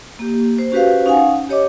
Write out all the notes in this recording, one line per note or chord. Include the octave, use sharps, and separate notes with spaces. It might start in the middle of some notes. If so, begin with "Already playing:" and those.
A#3 G4
C5
C#4 F#4 G4 B4 C5 F5
C#4 D#4 F5 F#5 G#5
G4 C#5 D#5 D6